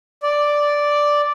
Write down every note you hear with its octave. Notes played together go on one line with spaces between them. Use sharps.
D5